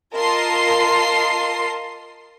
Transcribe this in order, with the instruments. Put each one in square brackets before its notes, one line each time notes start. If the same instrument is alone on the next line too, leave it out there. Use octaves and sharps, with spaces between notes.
[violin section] F4 A#4 D#5 A5 C6 C7